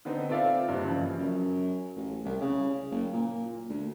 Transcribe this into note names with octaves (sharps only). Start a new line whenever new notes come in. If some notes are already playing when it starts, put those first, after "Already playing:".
D3 B3 C4 D#4
C4 F4 A4 D5 E5 F5
F#1 G2
C#3 E3 F3
F#2
A1
C2
C#3
F#1
A#2
D2